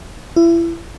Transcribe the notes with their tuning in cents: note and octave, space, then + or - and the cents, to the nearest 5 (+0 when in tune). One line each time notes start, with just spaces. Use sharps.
E4 +30